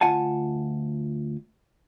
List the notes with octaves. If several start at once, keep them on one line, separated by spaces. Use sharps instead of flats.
D2 F4 F#5 G#5 A5